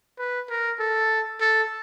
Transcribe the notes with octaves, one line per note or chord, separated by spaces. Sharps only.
B4
A#4
A4
A4